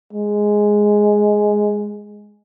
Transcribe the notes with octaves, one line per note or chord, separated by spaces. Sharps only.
G#3